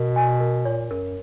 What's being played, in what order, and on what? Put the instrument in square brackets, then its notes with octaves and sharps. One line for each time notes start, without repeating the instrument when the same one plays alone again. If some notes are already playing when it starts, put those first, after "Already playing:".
Already playing: [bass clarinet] B2 [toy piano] A#4
[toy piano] G#5
A#4
[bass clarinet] A#2 [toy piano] C#5
[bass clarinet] F#2 [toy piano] A#4